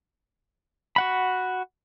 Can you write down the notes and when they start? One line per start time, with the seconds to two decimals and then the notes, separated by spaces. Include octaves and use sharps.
0.96 F#4 F#5 B5